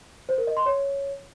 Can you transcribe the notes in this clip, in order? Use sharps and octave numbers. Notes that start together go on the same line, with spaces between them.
C5
A#4
D#5
C6
C#5